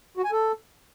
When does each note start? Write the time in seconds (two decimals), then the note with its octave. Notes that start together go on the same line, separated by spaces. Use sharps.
0.17 F#4
0.25 G#5
0.32 A4